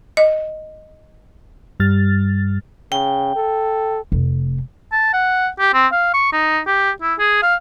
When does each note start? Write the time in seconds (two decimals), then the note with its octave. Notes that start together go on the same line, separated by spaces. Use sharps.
0.17 D#5
1.80 G2 G3 F6 A6
2.92 C#3 G5
3.36 A4
4.12 F1
4.92 A5
5.13 F#5
5.59 G4
5.74 C4
5.92 F5
6.14 C#6
6.32 D#4
6.66 G4
7.01 E4
7.19 G#4
7.42 F5